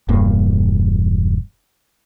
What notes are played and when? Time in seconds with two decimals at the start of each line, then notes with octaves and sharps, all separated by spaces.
0.09 E1 G2 A#3